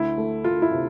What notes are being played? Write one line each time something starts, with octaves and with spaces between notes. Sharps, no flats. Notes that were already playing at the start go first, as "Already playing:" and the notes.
Already playing: D2 E4
A3
A3 F4
E4
C3